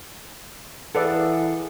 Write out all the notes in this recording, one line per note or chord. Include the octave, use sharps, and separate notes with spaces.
E3 G#4 A4 B4 D5 F5 F#5